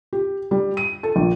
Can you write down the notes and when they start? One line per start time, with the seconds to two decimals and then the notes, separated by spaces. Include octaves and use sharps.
0.13 G4
0.51 G3
0.77 D#7
1.03 A4
1.16 A#1